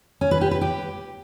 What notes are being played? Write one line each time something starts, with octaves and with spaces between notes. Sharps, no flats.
C#4
B4
G4
B4
G4